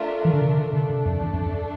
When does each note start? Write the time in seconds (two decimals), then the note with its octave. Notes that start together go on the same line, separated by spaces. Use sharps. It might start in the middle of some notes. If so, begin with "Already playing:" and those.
Already playing: A3 D4 F4 A#4 E5
0.25 E3
0.34 D3
0.41 C3
0.57 D3
0.73 C3 A3 D4 A4
0.90 C3
1.05 F2
1.21 E2
1.33 F2
1.45 F2